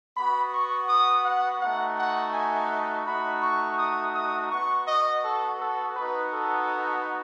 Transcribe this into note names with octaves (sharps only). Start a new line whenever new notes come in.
B3 F#4 B5
C#6
D#6
F#5
A3 D#4 F#4 F#5
F#5
G#5
A3 D#4 F#4 B5
C#6
D#6
D#6
B3 F#4 C#6
D#5
A4
A4
B3 D#4 F#4 B4
A4